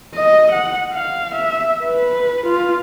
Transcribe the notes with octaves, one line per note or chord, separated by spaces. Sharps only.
D#5
F#5
F5
E5
B4
F4